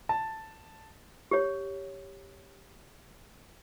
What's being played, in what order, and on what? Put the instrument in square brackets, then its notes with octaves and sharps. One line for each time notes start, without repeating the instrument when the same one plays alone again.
[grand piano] A5
[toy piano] G4 C#5